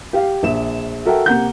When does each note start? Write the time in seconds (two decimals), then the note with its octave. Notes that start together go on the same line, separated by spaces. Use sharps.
0.13 G4 F5
0.43 A#1 E5 E7
1.06 F#4 A4 A#4 E5 F#5 G5
1.26 C3 A#3 F#5 G6